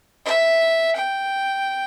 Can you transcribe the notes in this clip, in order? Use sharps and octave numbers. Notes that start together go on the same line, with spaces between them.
E5
G5